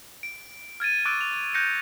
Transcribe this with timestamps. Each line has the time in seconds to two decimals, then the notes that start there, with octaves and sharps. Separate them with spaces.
0.23 D7
0.80 F6 G#6 A6 D#7
1.05 C#6 D6 E6 F#6 A6 D7
1.21 F7
1.54 F#6 G6 A#6 C#7